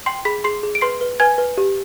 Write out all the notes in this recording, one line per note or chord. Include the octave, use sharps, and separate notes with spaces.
G5 C6 C7
G#4 B5 B6
G#4 C6 C7
G#4
D7
B4 C6 C7
B4
B4 G#5 G#6
B4
G4